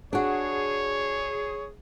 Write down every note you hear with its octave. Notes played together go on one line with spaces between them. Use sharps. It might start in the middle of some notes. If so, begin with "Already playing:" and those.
D4 F#4 G#4 C#5